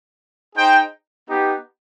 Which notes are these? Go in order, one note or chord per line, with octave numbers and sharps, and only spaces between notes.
D#4 G#4 C5 G5
B3 D#4 G4